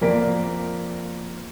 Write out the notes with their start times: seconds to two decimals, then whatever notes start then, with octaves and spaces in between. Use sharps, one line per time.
0.01 F2 A#3 A#4 D5 B6 D7